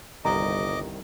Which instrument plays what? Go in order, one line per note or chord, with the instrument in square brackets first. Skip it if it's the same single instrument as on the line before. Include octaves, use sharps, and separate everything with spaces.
[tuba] G1 [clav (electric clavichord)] C2 D#3 [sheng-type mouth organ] D#5 D6 [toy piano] A#5